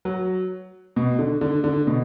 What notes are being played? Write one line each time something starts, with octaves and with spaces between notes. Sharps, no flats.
F#3
B2
D3
D3
D3
B2